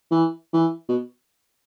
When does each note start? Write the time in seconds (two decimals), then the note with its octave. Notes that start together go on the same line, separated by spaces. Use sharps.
0.11 E3
0.53 E3
0.89 B2